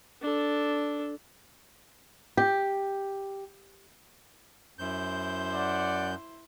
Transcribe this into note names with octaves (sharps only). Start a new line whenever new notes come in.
D4 A4
G4
F#2 E4 C5 G6
D5 F#5